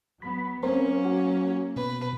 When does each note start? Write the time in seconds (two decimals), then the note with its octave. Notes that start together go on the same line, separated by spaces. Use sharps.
0.22 F#3 B3 B5
0.63 F#3 A#3 C4 C#4 A#4 C5
1.05 F#4
1.76 B2 B4